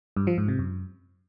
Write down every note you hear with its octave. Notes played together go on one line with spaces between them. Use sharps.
G2
F3
G#2
C3
F#2